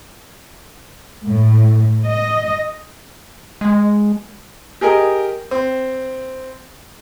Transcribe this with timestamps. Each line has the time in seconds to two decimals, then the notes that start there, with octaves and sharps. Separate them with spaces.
1.24 A2
2.06 D#5
3.61 G#3
4.81 G4 G#4 A#4 D#5
5.51 C4